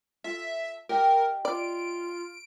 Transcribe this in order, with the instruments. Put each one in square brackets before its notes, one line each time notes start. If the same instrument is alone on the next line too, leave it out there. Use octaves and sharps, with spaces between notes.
[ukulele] F4 A4 [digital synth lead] E5
[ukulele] G4 D#5 G5 [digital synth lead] A#4
[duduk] F4 [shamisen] D5 [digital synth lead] D7